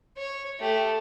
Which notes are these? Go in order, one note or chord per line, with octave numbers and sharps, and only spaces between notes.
C#5
A3 G4